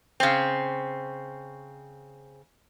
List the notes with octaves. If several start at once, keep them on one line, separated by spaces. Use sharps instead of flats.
C#3 C4